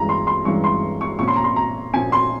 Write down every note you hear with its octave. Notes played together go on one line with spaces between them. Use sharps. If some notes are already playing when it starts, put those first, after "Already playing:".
Already playing: G2 E3 G#3 C#4 A#5
C6
C6
G2 E3 G#3 C#4 C#6
C6
C#6
A#2 F3 A#3 C#4 C#6
C6
A#5
C6
A#5
A#2 F3 A#3 C#4 G#5
C6